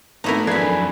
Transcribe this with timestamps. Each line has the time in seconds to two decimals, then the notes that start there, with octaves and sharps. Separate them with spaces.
0.24 G#1 A3 B3 D#4 E4 A#4
0.47 F2 F#3 D4 G#4 A4 B4 B5